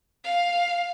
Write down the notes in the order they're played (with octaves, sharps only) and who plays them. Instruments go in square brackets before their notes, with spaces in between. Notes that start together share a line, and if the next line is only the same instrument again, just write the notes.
[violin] F5